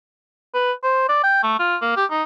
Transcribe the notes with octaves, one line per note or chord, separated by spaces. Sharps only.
B4
C5
D5
G5
A3
F4
A#3
G4
D#4